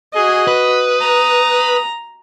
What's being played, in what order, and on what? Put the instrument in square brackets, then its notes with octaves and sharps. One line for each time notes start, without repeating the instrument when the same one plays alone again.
[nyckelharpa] F#4 D#5 [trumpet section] G#4
[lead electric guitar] B4 [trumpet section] D#6
[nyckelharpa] A#5